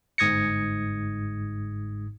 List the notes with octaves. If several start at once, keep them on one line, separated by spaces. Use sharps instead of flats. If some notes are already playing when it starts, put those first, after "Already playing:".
G1 G#2 D#6 G#6 A#6 C#7